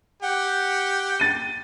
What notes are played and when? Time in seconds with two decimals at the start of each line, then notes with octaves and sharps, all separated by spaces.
0.23 G4 F#5
1.20 A6 D#7